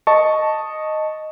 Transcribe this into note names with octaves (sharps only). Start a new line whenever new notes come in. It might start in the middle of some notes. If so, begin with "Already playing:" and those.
D#5 A5 C#6